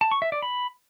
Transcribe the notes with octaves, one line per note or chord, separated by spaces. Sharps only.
A5
C#6
E5
D5
B5